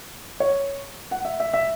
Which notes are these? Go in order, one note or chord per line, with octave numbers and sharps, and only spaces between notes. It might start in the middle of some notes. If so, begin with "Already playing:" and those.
C#5
F#5
E5
E5
E5